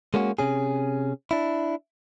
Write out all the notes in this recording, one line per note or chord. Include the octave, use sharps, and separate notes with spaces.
G#3 A#3 C#4 F#4
C3 C#4 G#4
D4 E4